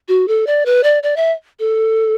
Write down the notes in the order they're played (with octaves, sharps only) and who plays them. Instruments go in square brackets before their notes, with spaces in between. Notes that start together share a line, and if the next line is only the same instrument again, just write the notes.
[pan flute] F#4
A4
D5
B4
D5
D5
E5
A4